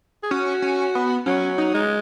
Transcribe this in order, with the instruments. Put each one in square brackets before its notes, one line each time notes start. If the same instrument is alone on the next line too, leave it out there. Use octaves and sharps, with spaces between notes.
[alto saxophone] G#4
[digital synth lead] C#4 [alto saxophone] F#4
[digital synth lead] C#4
B3
[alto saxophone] F#3 [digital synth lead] C#4
[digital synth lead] D#4
[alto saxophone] G#3